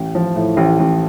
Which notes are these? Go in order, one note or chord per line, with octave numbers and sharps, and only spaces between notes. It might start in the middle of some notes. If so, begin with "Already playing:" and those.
Already playing: A1
F3
A2
A1
A1